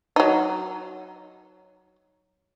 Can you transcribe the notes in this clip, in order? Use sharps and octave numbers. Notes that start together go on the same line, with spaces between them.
F#3 D#4